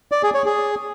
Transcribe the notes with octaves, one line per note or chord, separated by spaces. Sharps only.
D5
G#4
C#5
G#4